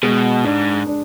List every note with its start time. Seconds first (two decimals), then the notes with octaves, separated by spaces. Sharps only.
0.03 B2 G#3
0.44 G#2 D4
0.87 D4